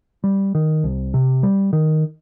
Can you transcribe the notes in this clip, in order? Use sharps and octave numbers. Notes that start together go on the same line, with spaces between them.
G3
D#3
C2
C3
G3
D#3